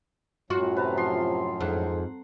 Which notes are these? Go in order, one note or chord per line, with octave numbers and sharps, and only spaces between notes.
F#2 A2 F#3 F4 F#4
C3 B4 A5 A#5
F3 C6
F2 G#2 F#5